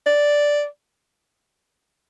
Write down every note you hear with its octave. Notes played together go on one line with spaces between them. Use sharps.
D5